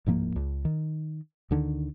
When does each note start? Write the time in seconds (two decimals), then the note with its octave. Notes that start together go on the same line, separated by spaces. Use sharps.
0.06 D1 G#2 F3 A#3
0.36 C#2
0.65 D#3
1.51 D2 D3 D#3